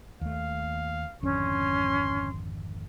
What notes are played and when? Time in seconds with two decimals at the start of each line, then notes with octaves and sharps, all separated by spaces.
0.21 D#2 A3 F5
1.23 G#1 F2 D3 C#4 C6